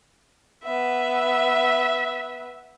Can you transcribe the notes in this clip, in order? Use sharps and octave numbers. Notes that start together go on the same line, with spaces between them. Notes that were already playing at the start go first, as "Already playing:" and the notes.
B3 E5